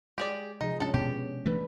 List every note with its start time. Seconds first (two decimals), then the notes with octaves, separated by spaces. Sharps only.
0.18 G#3 G4 G#4 D5
0.61 C3 F3 D#4 G#4
0.80 G#3 C#4 D4 A4 A5
0.94 B2 B3 D4 G4
1.46 E3 A3 D4 B4